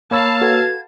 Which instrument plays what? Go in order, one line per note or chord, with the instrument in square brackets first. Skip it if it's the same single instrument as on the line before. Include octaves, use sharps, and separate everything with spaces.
[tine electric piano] A#3 C#5 E6 [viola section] F5 A5 [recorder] B5
[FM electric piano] F#4 A4 B4 [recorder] G#6